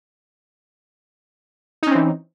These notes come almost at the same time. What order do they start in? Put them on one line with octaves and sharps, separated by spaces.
D#4 C#4 C4 E3